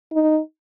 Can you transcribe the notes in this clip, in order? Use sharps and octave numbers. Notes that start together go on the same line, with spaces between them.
D#4